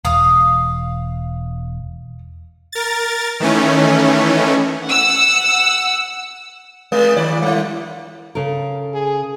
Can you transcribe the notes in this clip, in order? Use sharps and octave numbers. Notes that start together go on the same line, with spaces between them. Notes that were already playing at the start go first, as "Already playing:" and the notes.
E1 F5 D#6
A#4 A6
D#3 E3 A3 C#4
F#5 E6
G#3
G2 D#3 D5
G3 E4
C#3 A4 A#4
G#4